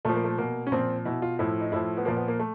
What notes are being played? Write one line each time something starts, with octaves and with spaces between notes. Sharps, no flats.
A#2 F3 A3
A#3
A3
B2 A#3
C#4
A#2 F3 C4
B2 E4
F4
A2 F3 E4
D#4
A2 F3 E4
B3
A#2 F3 A#3
B3
A#3
A3